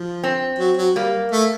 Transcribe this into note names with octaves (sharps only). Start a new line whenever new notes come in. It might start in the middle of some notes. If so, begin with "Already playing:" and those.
Already playing: F3
C4
F#3
F#3
G3 A#3
A3